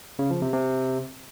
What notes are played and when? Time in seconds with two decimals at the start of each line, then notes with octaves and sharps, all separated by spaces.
0.19 C#3
0.30 F3
0.42 C3
0.53 C3